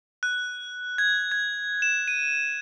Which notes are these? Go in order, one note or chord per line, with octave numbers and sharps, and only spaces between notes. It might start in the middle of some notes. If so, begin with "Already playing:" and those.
F#6
G#6
G#6
E7
D#7